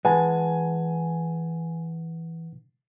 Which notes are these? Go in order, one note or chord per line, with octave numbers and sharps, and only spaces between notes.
E3 G#3 B4 F#5 G#5 A5